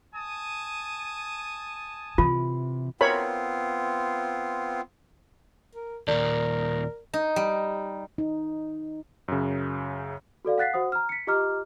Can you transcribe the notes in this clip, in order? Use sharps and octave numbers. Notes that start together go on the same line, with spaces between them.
G#5 A5 D#6
C3 E3 F4
B3 C4 F4 A#4 C#5 B5
A#4
D#2 A#2 A#4 D5
D#4
G3
D#4
F#2 C#3
F#4 A4 D5 F5
F5 F#5 F#6 A6 B6 C7
F#4 C5 F#5 D#6
A#5 F6
B6 C#7
F4 G4 D#5 A#5 D6 F6